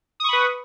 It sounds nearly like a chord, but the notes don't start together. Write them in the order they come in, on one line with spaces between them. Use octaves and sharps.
D#6 C#6 B5 B4